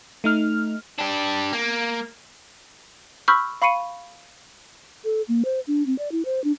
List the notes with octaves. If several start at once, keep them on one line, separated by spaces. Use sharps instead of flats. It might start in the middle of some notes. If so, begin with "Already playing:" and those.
A3 D#4 F6
D4 G4
A#3
B5 C#6 E6 F6 G6 B6
F5 B5 C#6 C7 C#7 D#7
A4
A#3
C5
D4
C4
D5
E4
C5
D4